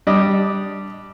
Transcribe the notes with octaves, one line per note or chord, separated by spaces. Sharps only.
G3 D4 D5 D#5